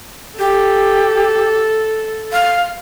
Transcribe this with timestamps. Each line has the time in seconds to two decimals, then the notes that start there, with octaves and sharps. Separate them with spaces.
0.39 G4 A4
2.33 F5